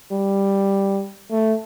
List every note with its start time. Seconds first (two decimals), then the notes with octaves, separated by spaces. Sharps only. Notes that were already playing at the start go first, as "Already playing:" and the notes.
0.12 G3
1.31 A3